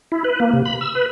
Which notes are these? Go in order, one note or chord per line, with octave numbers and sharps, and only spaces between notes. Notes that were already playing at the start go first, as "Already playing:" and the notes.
E4
B4
A#3
C3
B5
E6
B4